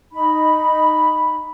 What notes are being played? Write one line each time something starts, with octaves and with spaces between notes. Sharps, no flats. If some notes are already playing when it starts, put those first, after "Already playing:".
D#4 B5